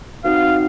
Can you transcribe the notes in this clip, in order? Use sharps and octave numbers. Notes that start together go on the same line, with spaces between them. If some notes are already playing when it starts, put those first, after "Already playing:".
C4 D#4 F#4 C5 F5